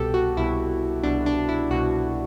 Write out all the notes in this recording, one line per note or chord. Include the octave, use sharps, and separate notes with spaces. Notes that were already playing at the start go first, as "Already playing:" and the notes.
Already playing: C2 B2 G4 A4
F#4
C2 B2 E4
C2 B2 D4
D4
E4
C2 B2 F#4